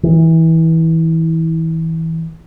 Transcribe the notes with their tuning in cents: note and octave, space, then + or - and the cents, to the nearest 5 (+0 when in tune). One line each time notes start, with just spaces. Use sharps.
E3 -25